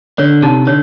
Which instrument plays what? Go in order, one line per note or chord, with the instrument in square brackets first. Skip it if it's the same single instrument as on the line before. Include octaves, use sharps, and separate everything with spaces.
[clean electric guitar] D3 [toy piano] C#5
[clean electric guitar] C3 [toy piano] D#4
[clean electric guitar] D3 [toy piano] C#5